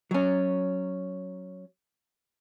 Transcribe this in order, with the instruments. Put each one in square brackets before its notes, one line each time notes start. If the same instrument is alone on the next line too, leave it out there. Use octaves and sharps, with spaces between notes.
[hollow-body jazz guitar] F#3 C#4